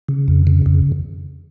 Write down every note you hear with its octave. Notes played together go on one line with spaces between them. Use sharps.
C#3
F2
C#3
F2